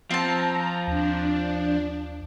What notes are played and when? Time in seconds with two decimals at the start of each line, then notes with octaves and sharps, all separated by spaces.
0.11 F3 C4 A5 A#5
0.87 D#2 D4